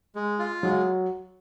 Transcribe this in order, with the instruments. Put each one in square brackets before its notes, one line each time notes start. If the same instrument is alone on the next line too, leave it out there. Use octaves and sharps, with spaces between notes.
[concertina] G#3
F4
[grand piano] F#3 [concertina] G#3